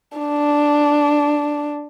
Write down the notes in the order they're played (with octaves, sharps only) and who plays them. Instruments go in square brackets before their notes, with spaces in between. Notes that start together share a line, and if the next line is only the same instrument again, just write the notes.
[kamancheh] D4